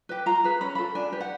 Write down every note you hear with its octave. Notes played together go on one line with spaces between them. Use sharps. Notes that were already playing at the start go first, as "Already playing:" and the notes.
G4 B4
F4 A#5
G#4 B4
C#4 B5
F4 A4 B5
D4 G#5
G4 B4
F#5